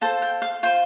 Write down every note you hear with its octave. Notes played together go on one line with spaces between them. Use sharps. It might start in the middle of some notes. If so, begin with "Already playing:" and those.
F4 A4 C5 A5
G5
F5
F4 C5 G5